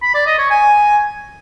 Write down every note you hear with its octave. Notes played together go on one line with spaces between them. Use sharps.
B5
D5
D#5
C#5
G#5